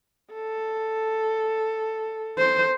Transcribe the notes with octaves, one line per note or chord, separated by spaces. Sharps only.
A4
C5